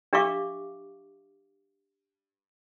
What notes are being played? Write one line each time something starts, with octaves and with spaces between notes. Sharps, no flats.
D4 G4 E5 F5 C#6 D6